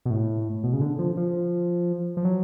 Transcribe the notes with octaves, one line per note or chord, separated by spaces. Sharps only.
B2
A2
B2
C#3
D3
F3
F3
F3
F#3